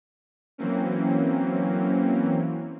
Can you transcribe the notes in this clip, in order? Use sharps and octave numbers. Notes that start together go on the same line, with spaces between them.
E3 F#3 A#3 C4 C#4